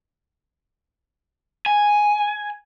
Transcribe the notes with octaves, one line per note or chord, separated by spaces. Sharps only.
G#5